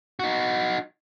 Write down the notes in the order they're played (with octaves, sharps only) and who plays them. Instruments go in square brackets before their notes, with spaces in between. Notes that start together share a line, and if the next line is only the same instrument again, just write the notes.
[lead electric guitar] D#4 F#4